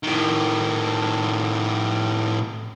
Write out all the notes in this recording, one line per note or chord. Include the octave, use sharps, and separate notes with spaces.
A2 D#3